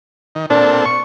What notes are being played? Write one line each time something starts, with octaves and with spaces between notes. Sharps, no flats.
D#3
A#2 C4 D4 A4
C#6